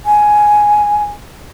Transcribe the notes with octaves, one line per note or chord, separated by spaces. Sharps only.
G#5